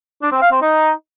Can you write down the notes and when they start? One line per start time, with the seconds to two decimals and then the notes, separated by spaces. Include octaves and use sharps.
0.21 D4
0.31 C4
0.41 F5
0.50 C4
0.60 D#4